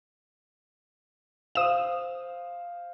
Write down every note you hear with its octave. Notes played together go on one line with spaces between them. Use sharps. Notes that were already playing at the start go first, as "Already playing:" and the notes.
C5 F5 D#6 E7